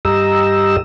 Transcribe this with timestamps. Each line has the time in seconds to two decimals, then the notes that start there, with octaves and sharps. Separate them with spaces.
0.05 G2 G4 D#5 A#5 E6